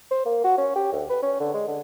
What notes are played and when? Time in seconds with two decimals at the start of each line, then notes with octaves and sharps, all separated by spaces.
0.11 C5
0.26 A#3
0.44 F#4
0.58 C#4
0.76 G4
0.92 D2
1.10 B4
1.22 C#4
1.40 D3
1.54 G#3
1.68 D3